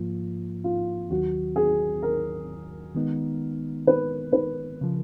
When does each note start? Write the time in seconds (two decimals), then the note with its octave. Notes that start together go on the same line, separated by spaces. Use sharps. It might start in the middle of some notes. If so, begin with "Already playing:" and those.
Already playing: G#2 F3 A#3 F4
0.64 F4
1.10 D#2 D#3 F#3 F#4
1.56 G#4
2.03 A#4
2.95 D#3 G#3 B3 D#4
3.87 B4
4.33 B4
4.81 C#3 F3